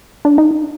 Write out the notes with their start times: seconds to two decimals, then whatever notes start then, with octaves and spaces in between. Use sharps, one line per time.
0.25 D4
0.38 D#4